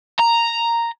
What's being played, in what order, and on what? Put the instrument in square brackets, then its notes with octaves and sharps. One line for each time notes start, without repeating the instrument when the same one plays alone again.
[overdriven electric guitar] A#5